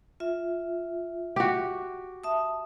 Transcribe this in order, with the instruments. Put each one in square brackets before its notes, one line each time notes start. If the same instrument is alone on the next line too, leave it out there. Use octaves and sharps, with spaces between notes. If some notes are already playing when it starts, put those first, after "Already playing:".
[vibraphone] F4 E5
[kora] F#4 G4
[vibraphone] E5 A5 D#6